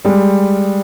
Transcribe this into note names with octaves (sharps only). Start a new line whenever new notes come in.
G3 G#3